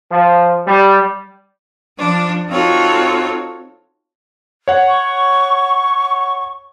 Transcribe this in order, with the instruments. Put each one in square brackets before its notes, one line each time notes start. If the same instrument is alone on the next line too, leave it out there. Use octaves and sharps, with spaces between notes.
[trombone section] F3
G3
[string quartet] F3 D4
C4 D#4 F4 F#4 A4 C#5
[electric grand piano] C#5 F#5
[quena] C#6